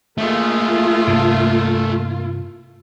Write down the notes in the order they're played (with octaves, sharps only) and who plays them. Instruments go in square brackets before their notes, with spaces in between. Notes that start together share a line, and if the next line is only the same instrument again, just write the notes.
[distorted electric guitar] A3 G#4 [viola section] A#3 F4
[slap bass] G2 C3